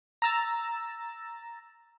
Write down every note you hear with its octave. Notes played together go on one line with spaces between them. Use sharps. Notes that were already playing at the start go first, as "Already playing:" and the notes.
A#5 E6 A6